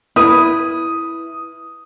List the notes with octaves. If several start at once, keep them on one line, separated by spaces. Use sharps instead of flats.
E4 B4 D#6